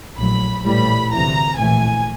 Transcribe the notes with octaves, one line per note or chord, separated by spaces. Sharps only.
A#1 A2 F#3 B5
A#1 A2 E3 G3 B5
D2 C3 E3 A#5
A#1 A2 E3 G#5